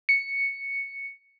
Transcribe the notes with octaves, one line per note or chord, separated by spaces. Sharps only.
C#7